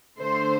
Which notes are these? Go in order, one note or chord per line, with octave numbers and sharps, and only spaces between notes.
D3 A3 C5